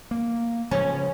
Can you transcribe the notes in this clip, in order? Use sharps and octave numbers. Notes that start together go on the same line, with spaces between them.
A#3
C#3 F3 C#4